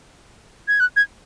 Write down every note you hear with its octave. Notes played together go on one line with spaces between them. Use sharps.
G#6
F#6
G#6